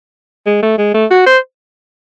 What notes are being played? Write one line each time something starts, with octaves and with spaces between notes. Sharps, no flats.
G#3
A3
G#3
A3
F#4
C5